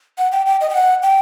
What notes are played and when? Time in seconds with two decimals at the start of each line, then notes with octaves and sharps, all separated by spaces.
0.18 F#5
0.32 G5
0.46 G5
0.61 D#5
0.70 G5
0.75 F#5
1.03 G5